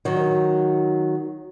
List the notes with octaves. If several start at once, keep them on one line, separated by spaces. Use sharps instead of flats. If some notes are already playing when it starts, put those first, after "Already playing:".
D#3 F#3